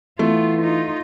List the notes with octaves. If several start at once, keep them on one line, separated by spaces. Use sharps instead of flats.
E3 A3 B3 F4
D#4 F4